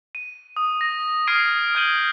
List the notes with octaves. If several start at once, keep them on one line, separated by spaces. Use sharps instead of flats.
D#7
D#6
A#6
D#6 F6 G#6 C7 D7 D#7
F6 G6 G#6 D#7 F#7 G7